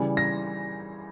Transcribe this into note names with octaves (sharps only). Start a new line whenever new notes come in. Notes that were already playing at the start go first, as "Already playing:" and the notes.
Already playing: C#3 E3 G3
A#6